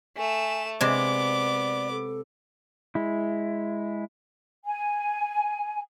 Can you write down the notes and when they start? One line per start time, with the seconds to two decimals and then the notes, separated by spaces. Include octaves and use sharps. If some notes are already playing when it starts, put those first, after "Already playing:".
0.17 A3 G#5 E7
0.81 C3 G#3 B3 D5 D6
1.92 A4
2.95 G#3 E4
4.64 G#5